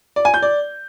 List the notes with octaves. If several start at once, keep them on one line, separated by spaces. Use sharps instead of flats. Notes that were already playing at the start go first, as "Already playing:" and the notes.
D5
G#5
G6
D5